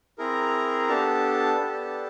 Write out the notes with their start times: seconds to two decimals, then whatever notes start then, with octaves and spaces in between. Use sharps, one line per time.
0.18 C4 E4 G#4 A#4 A#5
0.89 B3 D4 G4 A4 A5
1.59 B3 D4 G4